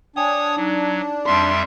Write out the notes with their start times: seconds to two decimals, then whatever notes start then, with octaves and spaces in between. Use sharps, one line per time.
0.16 D4 C#5 G5 G#5 D#6
0.57 F#3 D#4
1.26 F2 G3 E5 C6